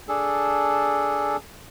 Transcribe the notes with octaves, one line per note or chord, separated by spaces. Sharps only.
D4 G#4 A4